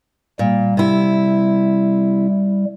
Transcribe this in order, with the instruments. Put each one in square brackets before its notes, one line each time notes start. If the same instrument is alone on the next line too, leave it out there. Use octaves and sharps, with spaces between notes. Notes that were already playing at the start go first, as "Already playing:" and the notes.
[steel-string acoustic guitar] A#2 [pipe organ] G3
[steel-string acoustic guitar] C3 E4